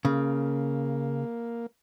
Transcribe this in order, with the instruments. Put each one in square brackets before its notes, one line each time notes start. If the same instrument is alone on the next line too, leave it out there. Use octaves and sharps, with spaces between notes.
[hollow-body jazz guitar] C#3 [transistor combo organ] A#3